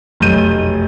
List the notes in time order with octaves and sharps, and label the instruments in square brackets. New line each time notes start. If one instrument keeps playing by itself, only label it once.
[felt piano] F1 B1 F#2 A3 G6 D#7